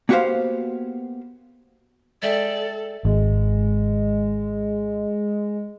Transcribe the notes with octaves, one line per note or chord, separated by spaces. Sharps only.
A#3 B3 F#4 G4 C5 F5
G#3 A4 D5 E5 G5
G#1 G#3